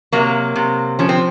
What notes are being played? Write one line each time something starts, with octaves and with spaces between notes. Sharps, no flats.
C3 F#3 A#3
C3
F3 C#4
C4